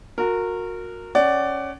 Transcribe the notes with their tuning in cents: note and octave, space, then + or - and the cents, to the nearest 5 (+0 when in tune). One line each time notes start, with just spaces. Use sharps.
F#4 -30 A#4 -15
C#4 +0 D5 +0 F#5 +30